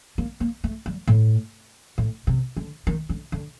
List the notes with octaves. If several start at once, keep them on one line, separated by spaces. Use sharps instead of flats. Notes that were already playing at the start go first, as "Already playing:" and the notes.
A#3
A#3
A3
G3
A2
A2
C3
D3
D#3
D3
D3